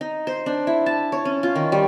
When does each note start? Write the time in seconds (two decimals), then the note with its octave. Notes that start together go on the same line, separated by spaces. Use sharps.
0.01 D#4
0.27 C5
0.46 D4
0.67 E4
0.86 A5
1.12 C#5
1.25 C#4
1.43 F4
1.55 D#3
1.72 G3